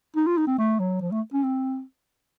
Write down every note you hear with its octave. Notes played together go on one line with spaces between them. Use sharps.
D#4
F4
D#4
C4
A3
F#3
F3
A3
C#4
C4